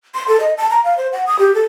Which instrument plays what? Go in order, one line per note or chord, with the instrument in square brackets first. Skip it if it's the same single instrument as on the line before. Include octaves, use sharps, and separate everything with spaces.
[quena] C6
A4
D#5
A5
A#5
F5
C5
F#5
D#6
G4
A4